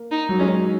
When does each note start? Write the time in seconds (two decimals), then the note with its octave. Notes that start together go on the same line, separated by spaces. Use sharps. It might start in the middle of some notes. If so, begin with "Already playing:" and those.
Already playing: A#3
0.12 D#4
0.29 F#3
0.40 G#3 C#4